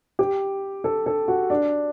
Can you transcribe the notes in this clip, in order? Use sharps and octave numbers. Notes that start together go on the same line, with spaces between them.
G4
A4
A4
F#4
D4